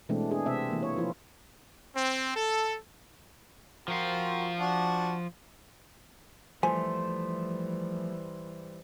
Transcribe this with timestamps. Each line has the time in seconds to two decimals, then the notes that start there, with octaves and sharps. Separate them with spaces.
0.09 B2 E3 G#3 A3 C4 D4
0.31 D4 G#4
0.46 C3 C4 E5
0.70 E3 A#3
0.83 C#5
0.97 F3 E4 F4
1.95 C4
2.34 A4
3.88 F3 C4 F4 F#4 A#4
4.60 D4 F#4 F#5
6.63 E3 F3 G3 A3 C5 G#5